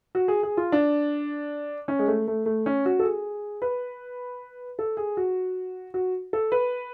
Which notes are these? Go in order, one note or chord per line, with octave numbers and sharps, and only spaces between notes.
F#4
G#4
G#4
F4
D4
C#4
G#3
A3
A3
A3
C#4
F#4
A4
G#4
B4
A4
G#4
F#4
F#4
A4
B4